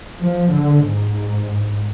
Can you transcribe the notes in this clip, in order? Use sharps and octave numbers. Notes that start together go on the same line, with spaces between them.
F3
D3
G#2